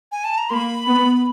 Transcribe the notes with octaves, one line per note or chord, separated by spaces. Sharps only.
G#5
A5
A#5
A#3 B5 C6
B3